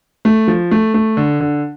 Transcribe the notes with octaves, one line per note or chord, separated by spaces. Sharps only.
A3
F3
A3
A3
D3
D3